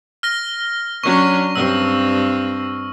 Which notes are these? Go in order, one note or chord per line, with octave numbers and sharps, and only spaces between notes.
F6 A#6 G7
F#3 C#4 D4 C#6
G2 C4 E6